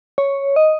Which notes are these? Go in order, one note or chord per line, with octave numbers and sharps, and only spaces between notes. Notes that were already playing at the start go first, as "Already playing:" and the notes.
C#5
D#5